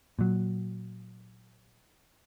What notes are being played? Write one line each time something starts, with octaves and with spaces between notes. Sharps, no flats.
A#2 F#3